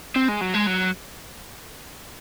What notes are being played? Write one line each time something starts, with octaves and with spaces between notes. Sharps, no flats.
C4
G#3
F#3
G#3
F#3